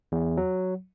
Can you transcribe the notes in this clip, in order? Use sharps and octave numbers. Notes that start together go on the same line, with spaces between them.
E2
F#3